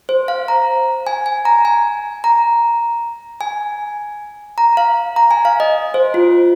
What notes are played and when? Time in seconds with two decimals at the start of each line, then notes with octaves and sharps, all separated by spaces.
0.09 C5
0.28 F5
0.48 A#5
1.07 G#5
1.26 G#5
1.45 A#5
1.65 G#5
2.24 A#5
3.41 G#5
4.58 A#5
4.77 F5
5.16 A#5
5.31 G#5
5.45 F5
5.60 D#5
5.94 C5
6.14 F4